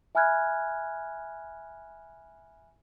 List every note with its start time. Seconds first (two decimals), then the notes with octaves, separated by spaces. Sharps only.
0.15 E5 G#5 B5 F6 F#6 G#6